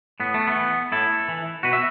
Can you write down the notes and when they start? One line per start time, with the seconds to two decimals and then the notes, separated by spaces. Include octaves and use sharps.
0.20 A2 B3
0.34 A3
0.47 B3
0.56 E3
0.92 A2 E4 A4
1.28 E3
1.63 B2 F#4 B4
1.73 E5